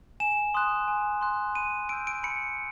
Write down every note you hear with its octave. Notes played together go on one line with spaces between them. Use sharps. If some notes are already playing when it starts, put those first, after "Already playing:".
G#5 E7
C6 D#6 F#6
G#5
C6 D#6 F#6
B5 D#7
E6 G6 D7
D7
B5 C#7